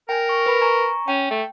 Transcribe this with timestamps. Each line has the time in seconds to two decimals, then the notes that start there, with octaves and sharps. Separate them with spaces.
0.09 A#4 G5 G#5
0.29 C#6
0.46 B4 B5
0.61 G#5 A#5 C#6
1.08 C#4 G5
1.31 A3